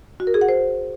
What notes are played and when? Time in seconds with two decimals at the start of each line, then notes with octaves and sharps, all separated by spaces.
0.20 F#4
0.27 A#4
0.34 G#4
0.41 F#5
0.49 C5